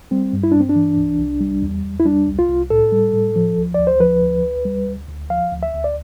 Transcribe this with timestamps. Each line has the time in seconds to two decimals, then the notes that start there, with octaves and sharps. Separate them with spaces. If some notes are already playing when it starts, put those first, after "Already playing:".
0.11 G3 C4
0.33 G2
0.43 E4
0.52 G2 D4
0.61 C4
0.69 D4
0.76 E3
0.97 C2
1.19 C2
1.40 G3
1.62 E2
1.84 E2
2.00 E4
2.06 G3 D4
2.27 C2
2.39 F4
2.49 C2
2.70 A2 A4
2.92 G3
3.14 A2
3.36 F3
3.57 D2
3.74 D2 D5
3.87 C5
4.00 F3 B4
4.22 D2
4.43 D2
4.65 G3
4.87 D2
5.08 D2
5.30 F3 F5
5.52 D2
5.63 E5
5.73 D2
5.84 D5